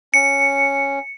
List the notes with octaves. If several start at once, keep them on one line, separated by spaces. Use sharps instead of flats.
C#4 C#7